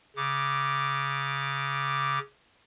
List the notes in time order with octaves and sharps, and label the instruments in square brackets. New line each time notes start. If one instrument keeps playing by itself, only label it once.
[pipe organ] C#3 D6